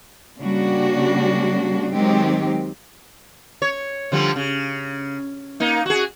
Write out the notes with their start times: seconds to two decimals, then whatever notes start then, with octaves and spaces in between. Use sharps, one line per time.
0.38 C#3 G3 A#3 D4 F#4
1.94 D#3 F#3 G#3 C4 D#4 G4
3.62 C#5
4.12 D3 F3 G3
4.36 C#3
5.60 A#3 D#4
5.86 F#4 G#4